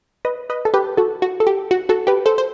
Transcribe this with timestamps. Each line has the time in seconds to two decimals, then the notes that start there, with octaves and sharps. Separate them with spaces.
0.25 B4 D#5
0.50 B4 D#5
0.65 A4
0.74 G4 B4
0.97 F#4 A4
1.22 F#4
1.40 A4
1.47 G4
1.71 F#4
1.89 F#4 A4
2.07 G4 B4
2.26 A4 C5
2.38 C5